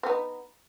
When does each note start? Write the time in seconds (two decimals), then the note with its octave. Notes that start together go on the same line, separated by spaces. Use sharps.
0.03 C4
0.07 B3
0.10 D#4